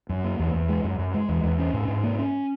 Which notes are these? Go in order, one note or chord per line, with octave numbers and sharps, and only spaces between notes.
F#2
A#3
E2
E2
G#3
F#2
F#2
G#3
E2
E2
C#4
G#2
G#2
A#3
C#4